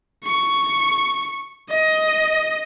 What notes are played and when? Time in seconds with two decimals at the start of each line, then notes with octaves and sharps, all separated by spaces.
0.25 C#6
1.70 D#5